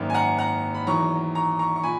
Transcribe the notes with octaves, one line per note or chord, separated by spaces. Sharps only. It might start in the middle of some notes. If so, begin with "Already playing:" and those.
Already playing: G#1 F#2 D#3 A#3
G#5
F#5 A#5
F#5 A#5
B5
E2 D#3 F#3 A#5 C#6
A#5 C#6
A#5 C#6
C#6
A#2 G#5 B5